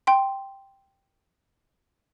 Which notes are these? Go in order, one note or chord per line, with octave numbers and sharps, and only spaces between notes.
G5 C6